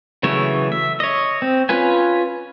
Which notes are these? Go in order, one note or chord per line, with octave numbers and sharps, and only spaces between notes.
C#3 E3 F#3 A3 C#5
E5
C#5 D#5
C4
C#4 F4 B4 G#5